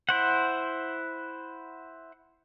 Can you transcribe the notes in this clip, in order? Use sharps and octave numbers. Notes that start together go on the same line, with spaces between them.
E4 C5 F#5